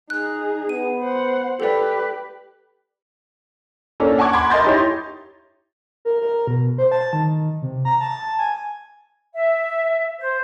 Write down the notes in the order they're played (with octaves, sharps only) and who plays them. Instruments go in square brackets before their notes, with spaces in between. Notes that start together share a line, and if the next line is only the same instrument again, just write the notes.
[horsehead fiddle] D#4 G#4 [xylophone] F#6
[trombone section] B3 [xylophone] D#7
[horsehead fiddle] C5 F#5
[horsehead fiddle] G4 B4 [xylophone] A4 D5
[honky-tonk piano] A#3 C#4 D4 A4
F#5 G#5 A5 C#6 D6 G#6
F#5 B5 C6 D6 G#6
A#4 D#5 G#5 C6 G6 A6
D#4 E4 G4 C#5 C6
[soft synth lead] A#4
A#4
B2
C5
A5
D#3
C3
A#5
A5
G#5
[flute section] E5
C5